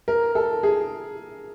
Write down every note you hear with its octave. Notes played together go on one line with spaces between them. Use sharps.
A#4
A4
G#4